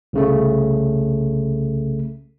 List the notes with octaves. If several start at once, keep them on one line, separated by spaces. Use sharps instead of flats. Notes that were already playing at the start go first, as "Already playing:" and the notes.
C2 C#3 A3